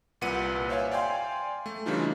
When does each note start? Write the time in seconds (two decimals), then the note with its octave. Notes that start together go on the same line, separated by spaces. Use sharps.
0.21 C2 A#2 B4 F#5 C#7 D#7
0.69 C5 C#5 E5 F5 G#5
0.91 D5 F5 G5 G#5 C6
1.66 A3
1.86 C#3 E3 G3 D4 D#4 F4